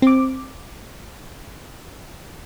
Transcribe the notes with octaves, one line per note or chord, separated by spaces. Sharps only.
C4 D6